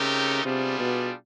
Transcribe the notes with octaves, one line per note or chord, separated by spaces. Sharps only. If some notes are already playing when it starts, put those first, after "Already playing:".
Already playing: C#3 A3 C4 D#4 G4 A#4
C3 G3 B3 D4 F4 G#4
B2